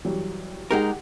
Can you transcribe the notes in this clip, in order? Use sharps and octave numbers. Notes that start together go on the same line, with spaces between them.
E3 F#3 G3
G#3 D#4 G4 G#4 A#4 F#5